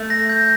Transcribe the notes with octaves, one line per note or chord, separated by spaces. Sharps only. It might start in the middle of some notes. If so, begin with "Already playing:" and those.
Already playing: A3
A#6
G6